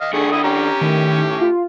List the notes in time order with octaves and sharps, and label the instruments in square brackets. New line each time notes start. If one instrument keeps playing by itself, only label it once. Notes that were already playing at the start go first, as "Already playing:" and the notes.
[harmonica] D#5 F5
[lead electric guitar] D#3 D4 [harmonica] A3 G#4
[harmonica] E4 D#6
[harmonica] C#4 G4 [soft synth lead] A#5
[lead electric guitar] A2 [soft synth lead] D#3
[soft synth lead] F4